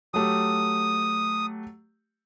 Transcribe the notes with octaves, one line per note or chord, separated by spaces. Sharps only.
F#3 A3 G4 D#6